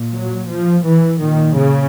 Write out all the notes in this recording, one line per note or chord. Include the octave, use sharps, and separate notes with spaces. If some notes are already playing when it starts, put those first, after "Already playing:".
Already playing: A#2
F#3
F3
E3
A#2 D#3
C#3